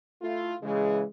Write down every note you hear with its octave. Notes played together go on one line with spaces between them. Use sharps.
A3 E4 F4
C#3 E3 G#3